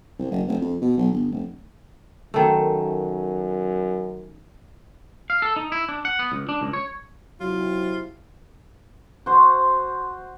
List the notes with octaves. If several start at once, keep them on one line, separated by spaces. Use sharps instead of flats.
C2
F#1
F1
F2
B2
B1
G1
F1
F#2 D#3 A3
F5
A4
D#4
E4
D4
F#5
B3
C#2
D4
C#2
C#5
C3 F#3 E4 F4
F#4 C5